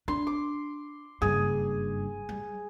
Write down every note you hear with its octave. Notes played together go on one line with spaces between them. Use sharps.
D4 C6
D6
F#1 G2 G#4
G3